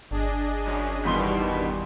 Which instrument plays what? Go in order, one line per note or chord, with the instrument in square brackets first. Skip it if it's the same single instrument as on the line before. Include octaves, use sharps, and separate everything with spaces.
[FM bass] G1 [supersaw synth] D4 G#4 D#5
[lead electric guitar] F#2
[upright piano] E2 C6 G7 [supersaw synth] G2 D#3 G3 [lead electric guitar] B2